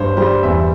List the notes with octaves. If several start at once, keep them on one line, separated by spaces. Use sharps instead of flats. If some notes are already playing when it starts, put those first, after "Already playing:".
Already playing: G2 C5 C#5
G3 C5
E2 E5